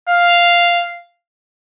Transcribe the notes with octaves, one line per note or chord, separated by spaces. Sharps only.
F5